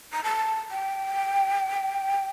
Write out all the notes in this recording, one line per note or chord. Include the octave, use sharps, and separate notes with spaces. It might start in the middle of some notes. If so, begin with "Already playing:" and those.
A#5
A5
G5